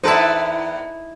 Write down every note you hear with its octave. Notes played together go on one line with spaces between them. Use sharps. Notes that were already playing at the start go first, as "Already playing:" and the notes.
E2 D#4 E4 A4 B4 C5 D5